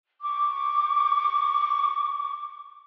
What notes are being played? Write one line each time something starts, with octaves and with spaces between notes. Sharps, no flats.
C#6 D6